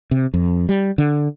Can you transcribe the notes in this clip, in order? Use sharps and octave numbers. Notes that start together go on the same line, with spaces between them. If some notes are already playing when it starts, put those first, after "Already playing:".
C3
F2
G3
D3